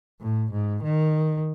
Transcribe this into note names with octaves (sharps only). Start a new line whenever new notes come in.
A2
G#2
D#3